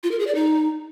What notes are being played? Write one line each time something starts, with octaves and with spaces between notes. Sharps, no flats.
F4
A#4
G#4
D5
D#4